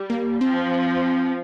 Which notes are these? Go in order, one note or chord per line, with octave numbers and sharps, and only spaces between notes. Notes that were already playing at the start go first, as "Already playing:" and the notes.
Already playing: G3
A#3
F3 C4